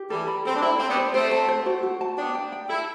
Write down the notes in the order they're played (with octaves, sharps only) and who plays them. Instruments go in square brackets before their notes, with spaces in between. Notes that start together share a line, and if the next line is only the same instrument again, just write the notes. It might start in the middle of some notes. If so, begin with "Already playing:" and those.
Already playing: [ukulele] G4
[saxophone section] E3 G3 [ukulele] A4
[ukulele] B5
[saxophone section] C4 [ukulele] A4
[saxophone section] D4
[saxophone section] C4 E4 [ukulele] B5
[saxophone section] C4 [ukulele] G5
[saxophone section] B3 D4
[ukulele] C5
[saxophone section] A3 C4 [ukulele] C5
[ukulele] A5
C5
F#4
F#4
A5
[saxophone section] B3 D4 [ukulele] G5
[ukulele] G5
G5
[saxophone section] E4 [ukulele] A4